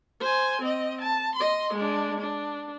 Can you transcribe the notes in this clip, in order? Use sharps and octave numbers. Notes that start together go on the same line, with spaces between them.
C5 G#5
C4 D#5
A5
D#5 C6
G#3 D4
D4